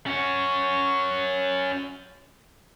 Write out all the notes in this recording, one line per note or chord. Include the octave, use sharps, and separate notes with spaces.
C#4 F#4